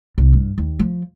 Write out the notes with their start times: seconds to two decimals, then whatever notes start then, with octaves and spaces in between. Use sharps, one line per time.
0.18 C2
0.33 G2
0.58 D#2
0.79 F3